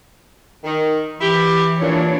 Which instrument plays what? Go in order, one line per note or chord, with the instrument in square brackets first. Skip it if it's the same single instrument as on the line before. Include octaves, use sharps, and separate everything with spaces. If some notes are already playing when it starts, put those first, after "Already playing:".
[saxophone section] D#3
[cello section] E3 [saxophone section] E4 G4
[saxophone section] A#2 [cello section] E3 D4 C#5